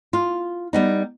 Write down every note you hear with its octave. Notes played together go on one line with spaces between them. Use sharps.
F4
G3 B3 D#4